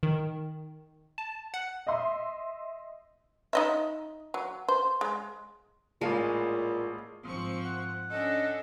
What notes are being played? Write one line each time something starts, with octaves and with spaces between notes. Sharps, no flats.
D#3
A5
F#5
D#5 E5 C6
D#4 D#5 E5
F#3
C5
G#3
A1 A#2 G#3 F5 A5
G#1 F3 C4 C#6
F#5
C#4 D4 A4 D#5